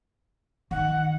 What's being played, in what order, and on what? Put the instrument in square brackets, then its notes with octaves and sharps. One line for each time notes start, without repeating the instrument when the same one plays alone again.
[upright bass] D#3 [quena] F#5